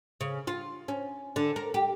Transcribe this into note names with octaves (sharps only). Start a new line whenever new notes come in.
C#3
F4
C#4
D3
A#4
G4